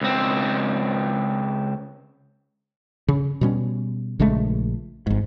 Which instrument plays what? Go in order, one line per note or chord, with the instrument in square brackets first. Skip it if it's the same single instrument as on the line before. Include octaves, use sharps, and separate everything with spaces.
[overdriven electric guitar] C#2 C4
[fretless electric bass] C#3
B2 G3 C#4
A#1 C#3 G#3 A3
G#1 G#2